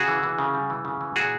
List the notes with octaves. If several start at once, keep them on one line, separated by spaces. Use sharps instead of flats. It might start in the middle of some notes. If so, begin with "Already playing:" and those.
Already playing: C#3 F#4 G#4
E3
E3
C#3
G3
E3
C#3
E3
A#2 F#4 G#4